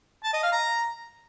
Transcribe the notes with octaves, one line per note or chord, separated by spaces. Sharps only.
A5
D#5
F5
A#5